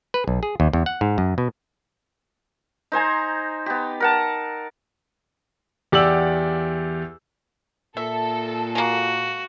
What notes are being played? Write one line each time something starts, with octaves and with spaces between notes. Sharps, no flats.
B4
B1
G#4
D#2
E2
F#5
G#2
F#2
B2
D#4 C5 G#5 A#5
B3 G4
A#4 F#5 A5
E2 G4 D5 F#5 E6 F#7
A#2 A4 E5
G#3 A#3 F#4